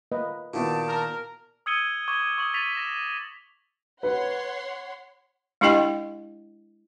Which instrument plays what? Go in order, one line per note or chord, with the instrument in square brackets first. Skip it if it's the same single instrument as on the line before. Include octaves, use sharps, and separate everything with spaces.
[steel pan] A#3 B4 D#5
[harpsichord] A#2 D#3 [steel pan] B3 E4 F#4 [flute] A5
[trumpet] A#4
[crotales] D#6 E6 G#6 C#7 D#7 G7
C#6 D6 G#6 G7
C#6 D#6 G#6 F#7
C#6 A6 B6 D#7 F7
A#6 E7
[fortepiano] B4 [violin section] C#5 F#5 C6
[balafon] G#3 D4 E4 G4 D#5 G5